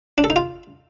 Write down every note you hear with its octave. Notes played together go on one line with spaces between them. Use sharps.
D4
A4
D#4
F4